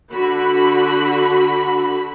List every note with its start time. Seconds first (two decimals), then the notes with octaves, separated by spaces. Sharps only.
0.12 D3 F#4 B5